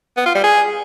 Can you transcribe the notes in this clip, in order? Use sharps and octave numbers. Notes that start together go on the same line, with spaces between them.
B3
F4
G3
G#4